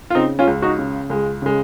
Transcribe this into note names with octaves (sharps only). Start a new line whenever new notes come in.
F4
C#3 C4 D#4
C#4 F4
C#2
D#4 F#4
C#3
C#2 G#3
C#3 G#3